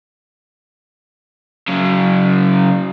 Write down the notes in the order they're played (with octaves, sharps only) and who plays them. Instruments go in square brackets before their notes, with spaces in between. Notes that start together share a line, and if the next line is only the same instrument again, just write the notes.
[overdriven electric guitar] C#3 F#3